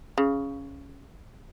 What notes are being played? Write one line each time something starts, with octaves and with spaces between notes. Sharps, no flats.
C#3